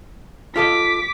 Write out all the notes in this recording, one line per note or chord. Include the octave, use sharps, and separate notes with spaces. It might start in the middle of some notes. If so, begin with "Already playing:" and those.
F4 A4 D#5 D6 B6